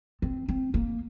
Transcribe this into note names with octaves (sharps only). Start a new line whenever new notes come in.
C4
C4
A#3